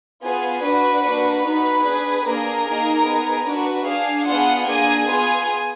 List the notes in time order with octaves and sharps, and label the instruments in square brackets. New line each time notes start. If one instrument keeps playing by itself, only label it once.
[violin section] B3 F4 G#4
D4 F#4 B4
A#3 D4 F#4 B4
B3 D#4 F#4
D4 G#4
A#3 D4 G#4 A#4
A#3 D#4 G#4
B3 D#4 G#4
D4 F#4 B4
D4 G#4 F5
B3 D4 F4 G#4 F#5
A#3 D4 G#4 G#5
B3 F4 G#4 G#5